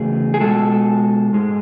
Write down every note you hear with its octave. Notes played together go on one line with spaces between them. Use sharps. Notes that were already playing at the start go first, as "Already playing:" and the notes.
Already playing: E2 C#3 F#3 A3 G#4
G#4
B2 G#3 A4
G#2 G#3